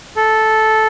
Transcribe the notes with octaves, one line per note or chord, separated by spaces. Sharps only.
A4